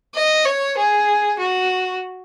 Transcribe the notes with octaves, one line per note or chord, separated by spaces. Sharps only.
D#5
C#5
G#4
F#4